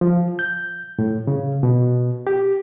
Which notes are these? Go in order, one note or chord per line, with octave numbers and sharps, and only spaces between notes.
F3
G6
A2
C#3
B2
G4